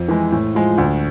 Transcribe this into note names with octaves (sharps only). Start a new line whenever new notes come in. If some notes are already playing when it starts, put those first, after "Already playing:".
Already playing: F2
E3 G#3
A2
F3 G#3
D2